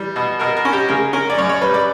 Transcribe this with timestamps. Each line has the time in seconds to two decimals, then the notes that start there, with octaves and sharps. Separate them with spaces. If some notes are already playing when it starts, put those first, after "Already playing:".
Already playing: E3 G3
0.16 B2
0.39 B2 A#4
0.57 A#4
0.65 C#4
0.73 G4
0.88 C#3 A#4
1.13 C#4 A#4
1.30 D5
1.37 F#2 C#5
1.49 C#5
1.61 G3 B4
1.74 D5